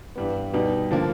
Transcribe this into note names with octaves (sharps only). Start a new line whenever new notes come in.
G2 E3 G3 B3
B2 G3 B3 D#4
D3 F3 A#3